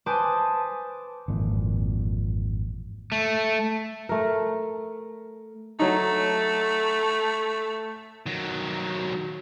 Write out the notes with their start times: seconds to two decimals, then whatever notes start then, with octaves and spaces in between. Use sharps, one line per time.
0.06 B4 C5 G#5 A5 D6 D#6
1.28 G#1 F2 A#2 E3
3.12 A3
4.09 A3 A#4
5.79 F#3 A3 D#4
8.26 D#3 F#3